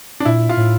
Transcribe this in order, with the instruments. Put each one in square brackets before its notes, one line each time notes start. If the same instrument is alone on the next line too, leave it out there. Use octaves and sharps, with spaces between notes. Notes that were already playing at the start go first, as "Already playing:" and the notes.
[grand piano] D4
[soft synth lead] A#2 [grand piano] E4
[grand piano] F4
[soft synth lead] A2